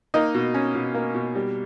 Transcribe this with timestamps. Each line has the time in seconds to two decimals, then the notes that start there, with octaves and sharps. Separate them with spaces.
0.14 A#3 D#4 D#5
0.35 B2
0.54 C#4
0.75 B2
0.94 A#3
1.15 B2
1.35 G3